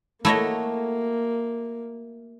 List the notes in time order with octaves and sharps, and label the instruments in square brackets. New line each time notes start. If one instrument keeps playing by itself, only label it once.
[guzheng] A3 F#4 [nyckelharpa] A#3 [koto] E4 C#5 D#5